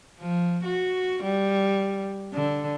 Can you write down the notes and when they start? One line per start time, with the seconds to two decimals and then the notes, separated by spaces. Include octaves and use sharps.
0.20 F3
0.65 F#4
1.24 G3
2.33 D3